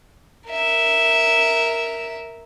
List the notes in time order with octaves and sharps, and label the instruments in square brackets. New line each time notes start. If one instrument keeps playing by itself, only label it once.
[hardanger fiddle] A#4 E5